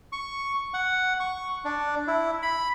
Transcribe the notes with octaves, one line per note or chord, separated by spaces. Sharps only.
C#6
F#5
C#6
D4
E4
B5